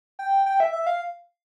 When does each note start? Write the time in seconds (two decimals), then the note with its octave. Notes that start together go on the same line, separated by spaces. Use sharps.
0.19 G5
0.46 G5
0.60 E5
0.73 E5
0.87 F5